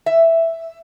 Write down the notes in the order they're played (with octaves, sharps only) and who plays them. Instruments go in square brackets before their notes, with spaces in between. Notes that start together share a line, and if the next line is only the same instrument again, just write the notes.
[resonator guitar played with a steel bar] E5